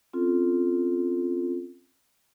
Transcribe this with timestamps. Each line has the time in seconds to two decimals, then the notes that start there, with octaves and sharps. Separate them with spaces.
0.13 C4 C#4 F4 A4